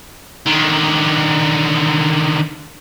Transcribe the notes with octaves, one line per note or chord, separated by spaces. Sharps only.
D3 D#3